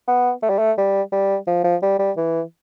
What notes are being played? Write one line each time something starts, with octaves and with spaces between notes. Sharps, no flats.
B3
A3
G3
A3
G3
G3
F3
F3
G3
G3
E3